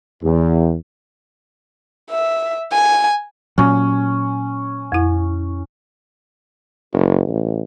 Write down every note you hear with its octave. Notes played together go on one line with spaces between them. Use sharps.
E2
E5
G#5
A#2 F#3 C#4
F2 E4
F#1
A1